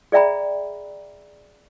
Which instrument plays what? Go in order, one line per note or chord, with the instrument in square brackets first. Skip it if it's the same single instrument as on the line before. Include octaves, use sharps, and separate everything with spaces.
[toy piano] G#4 D5 E5 G5 A#5 B5